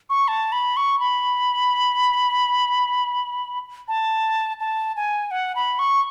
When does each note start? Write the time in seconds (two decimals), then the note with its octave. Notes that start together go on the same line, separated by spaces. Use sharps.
0.10 C#6
0.28 A5
0.52 B5
0.77 C#6
1.00 B5
3.88 A5
4.60 A5
4.96 G#5
5.31 F#5
5.56 B5
5.79 C#6